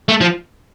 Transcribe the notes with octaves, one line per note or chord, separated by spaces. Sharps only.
A3
F3